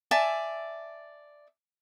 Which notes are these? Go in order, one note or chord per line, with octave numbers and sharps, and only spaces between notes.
D5 E5 G#5 A5